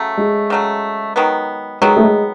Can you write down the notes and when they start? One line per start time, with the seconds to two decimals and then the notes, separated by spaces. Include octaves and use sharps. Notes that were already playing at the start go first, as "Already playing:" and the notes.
Already playing: C#3 F#3 A3
0.17 G#3
0.50 C#3 F#3 A3
1.16 D#3 F#3 B3
1.81 D#3 F#3 G#3 B3
1.97 A3
2.04 G#3